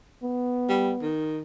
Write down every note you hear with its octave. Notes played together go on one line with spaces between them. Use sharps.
B3
G3
D#3